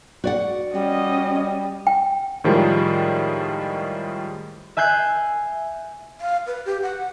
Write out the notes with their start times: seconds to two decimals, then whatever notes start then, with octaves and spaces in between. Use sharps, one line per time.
0.24 F#4 D5 F#5
0.74 G3 C#4 D#5
1.87 G5
2.44 A2 D#3 F3 G3 G#3
4.77 E5 G#5 F#6 G6 C7
6.21 F5
6.47 B4
6.66 G4
6.82 F#5